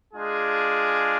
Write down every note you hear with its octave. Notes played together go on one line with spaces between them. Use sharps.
G#3 D4 F4 G#4